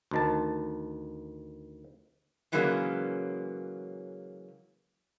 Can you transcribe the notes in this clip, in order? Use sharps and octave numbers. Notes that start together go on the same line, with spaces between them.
D2 D#3 A5
C#3 E3 F#3 G#3 A#3 C#4